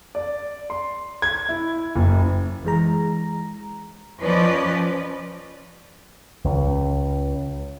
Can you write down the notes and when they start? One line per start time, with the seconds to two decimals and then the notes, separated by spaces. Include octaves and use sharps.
0.15 D5
0.70 C6
1.22 G#6
1.49 E4
1.96 F#1
2.65 E3 G#3 A#5
4.23 F3 C#4 B4 D5 D#5
6.45 C#2